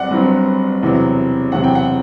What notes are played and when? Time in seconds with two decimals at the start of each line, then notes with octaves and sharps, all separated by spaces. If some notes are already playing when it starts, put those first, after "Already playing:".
Already playing: G1 G2 F#3 C4 D5 F#5
0.11 G1 G2 F#3 C4
0.82 E1 E2 C3 F#3 C4
1.52 E1 E2 C3 F#3 C4 F#5
1.64 G5
1.75 F#5